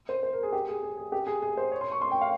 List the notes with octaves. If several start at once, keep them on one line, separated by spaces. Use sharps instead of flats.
C5
C5
A#4
G#4
G4
G#4
G#4
G#4
G4
G#4
G#4
C5
C#5
C6
C#6
C6
G5
F5